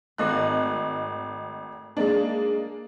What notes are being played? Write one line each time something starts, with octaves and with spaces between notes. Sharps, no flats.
G#1 A3 D#5 F#6
G#3 A#3 D4